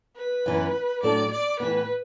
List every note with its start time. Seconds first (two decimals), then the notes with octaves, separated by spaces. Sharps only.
0.17 B4
0.46 F#2 E3 B3
1.03 A2 F#3 D4 A4 D5
1.32 D5
1.60 A2 E3 B3 B4